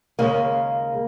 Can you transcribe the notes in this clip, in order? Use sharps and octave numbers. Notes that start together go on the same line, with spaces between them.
D#2 C#3 G#3 A#3